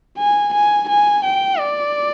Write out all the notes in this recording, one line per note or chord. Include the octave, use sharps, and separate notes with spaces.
G#5
G#5
G#5
G5
D5